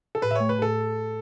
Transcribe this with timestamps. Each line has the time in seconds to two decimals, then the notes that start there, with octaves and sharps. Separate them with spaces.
0.15 A4
0.22 A2 B4
0.31 E5
0.35 A3 C#5
0.49 B4
0.58 A2 A4